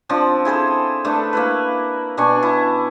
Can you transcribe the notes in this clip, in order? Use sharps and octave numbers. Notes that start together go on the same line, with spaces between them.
F3 C4 D4
E4 G#4 A4 C5
A3 D4 A4 B4
A#3 E4 B4
B2 D4 G#5 C#6
E4